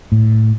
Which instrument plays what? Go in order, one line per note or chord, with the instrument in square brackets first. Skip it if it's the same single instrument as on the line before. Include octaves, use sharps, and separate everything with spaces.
[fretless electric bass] A2